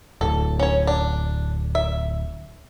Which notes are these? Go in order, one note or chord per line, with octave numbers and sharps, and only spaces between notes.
D1 A4
C#4 C#5
D4
E5